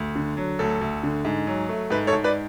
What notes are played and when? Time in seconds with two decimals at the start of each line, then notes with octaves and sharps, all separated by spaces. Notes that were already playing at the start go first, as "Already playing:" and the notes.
Already playing: D2
0.15 D3
0.37 F#3
0.59 D2 A4
0.81 D2
1.03 D3
1.25 G#2
1.47 F#3
1.69 A3
1.90 G#2 B4
2.07 A4 C#5
2.13 G#2
2.24 B4 D5